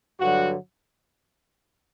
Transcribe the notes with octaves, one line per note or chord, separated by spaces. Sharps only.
G2 D3 F#3 F#4